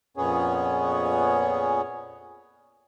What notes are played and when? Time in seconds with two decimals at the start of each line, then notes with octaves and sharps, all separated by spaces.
0.17 F2 A#2 B3 C#4 G#4 C#5